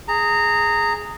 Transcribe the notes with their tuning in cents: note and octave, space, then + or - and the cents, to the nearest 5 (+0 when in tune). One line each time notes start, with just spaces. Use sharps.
G#4 +0 A#5 -20